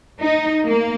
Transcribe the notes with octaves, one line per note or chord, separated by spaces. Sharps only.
D#4
A#3